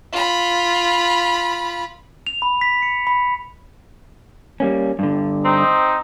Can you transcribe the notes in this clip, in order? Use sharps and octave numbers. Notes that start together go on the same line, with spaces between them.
F4 B5
F7
B5
B6
C#7
B5
G3 A#3 C#4
G2 D3
C4 D#4